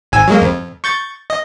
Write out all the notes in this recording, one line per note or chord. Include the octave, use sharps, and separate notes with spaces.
G#1 G#5 E6
F#3 G#3 A#3
F2
C#6 G6 A6
D#5